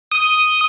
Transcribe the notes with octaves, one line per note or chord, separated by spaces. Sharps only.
D#6